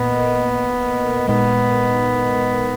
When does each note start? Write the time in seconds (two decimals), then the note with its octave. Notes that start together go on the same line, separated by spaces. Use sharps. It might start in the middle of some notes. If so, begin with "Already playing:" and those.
Already playing: A#2 A#3 B3 A#4 D#5
1.28 A#2 G#3 B3 D#4 A#4 D#5